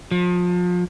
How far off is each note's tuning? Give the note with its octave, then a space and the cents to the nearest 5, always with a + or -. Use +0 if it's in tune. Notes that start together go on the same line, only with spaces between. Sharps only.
F3 +30